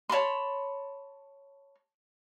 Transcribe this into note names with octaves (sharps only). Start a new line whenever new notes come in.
C#5 A5 B5 C6